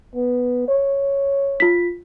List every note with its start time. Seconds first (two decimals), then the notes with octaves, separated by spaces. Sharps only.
0.15 B3
0.68 C#5
1.60 F4 B6